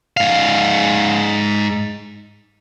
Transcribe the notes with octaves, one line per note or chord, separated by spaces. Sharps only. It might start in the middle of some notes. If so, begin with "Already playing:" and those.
G#2 F5